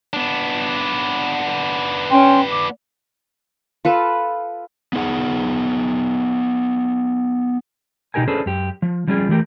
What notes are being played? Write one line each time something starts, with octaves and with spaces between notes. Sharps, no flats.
B3 D4
C#4 G5 C6
D6
F4 A4 B4
B3 D#4 G#4 F#5
B2 D#4 G4 A#4 G#5
C#4 D4 G#4 A4 B4 C5
F#2 G4
F3
F3 G3 C#4 F4 G#4
E3 A3 G4 A#4